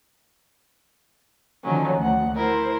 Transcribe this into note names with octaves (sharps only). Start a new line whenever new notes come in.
D3 D#3 F3 F#3 C#4 D#4
D2 F#5
E4 A#4 C5